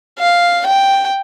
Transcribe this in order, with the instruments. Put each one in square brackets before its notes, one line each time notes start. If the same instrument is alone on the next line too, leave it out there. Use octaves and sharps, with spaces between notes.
[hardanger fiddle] F5
G5